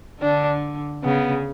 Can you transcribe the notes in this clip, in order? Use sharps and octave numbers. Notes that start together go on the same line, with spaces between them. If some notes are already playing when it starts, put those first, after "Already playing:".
D3 D4
C#3 B3